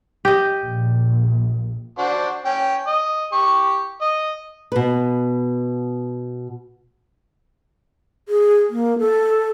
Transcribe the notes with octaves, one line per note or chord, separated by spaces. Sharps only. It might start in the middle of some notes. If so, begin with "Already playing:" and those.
G4 D#5
A#1
D4 F#4 C5
C#4 G5
D#5
G4 C#6
D#5
B2 B4
G#4
A#3
A4